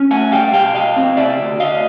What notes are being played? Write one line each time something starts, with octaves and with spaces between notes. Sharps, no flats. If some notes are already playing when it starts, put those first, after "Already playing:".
Already playing: C#4
A3 F#5 G#5
G3 F5 G5
B2 F5 G5
B2 D#5 F5
C4
C3 D5 E5
D2
D2 D#5 F5